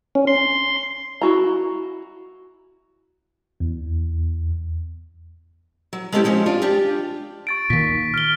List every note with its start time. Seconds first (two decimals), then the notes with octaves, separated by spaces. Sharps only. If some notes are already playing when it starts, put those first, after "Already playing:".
0.15 C#4
0.27 C6
1.22 E4 F#4 A#5
3.60 E2
5.93 F#3
6.12 G#3 A3 B3 C#4 E4 G4
6.24 F3 G#3 C#4 C5
6.46 D4 F4 D5
6.62 D4 F4 G4
7.47 C#6 A6 D7
7.70 A#2 D#3 B6
8.14 F6 G7